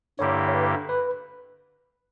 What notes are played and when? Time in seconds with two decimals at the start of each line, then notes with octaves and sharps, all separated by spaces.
0.19 G2 D3 A#3 E4 G4 C#5
0.48 C#5
0.54 B4
0.89 B4